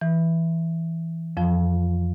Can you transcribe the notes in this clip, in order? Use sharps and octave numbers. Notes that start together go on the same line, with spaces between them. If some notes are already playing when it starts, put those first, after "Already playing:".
E3
F2 F3